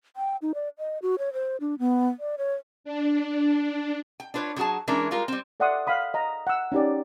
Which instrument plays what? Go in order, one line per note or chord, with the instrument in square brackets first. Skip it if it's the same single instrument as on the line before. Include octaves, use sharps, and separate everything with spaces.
[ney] G5
D#4
D5
D#5
F#4
C#5
C5
D4
B3
D5
C#5
[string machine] D4
[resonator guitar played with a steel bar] G5
D4 F4 B4 C#5
D3 F#3 F#4 G#4 A5
E3 G#3 C#4 D4 E4 A#4
G3 G#3 F4 A#4
G3 C4
[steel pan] A4 D5 E5 F#5 C6 D#6
F5 F#5 B5 D#6
D#5 A#5
F#5 E6
C#4 D#4 G4 D5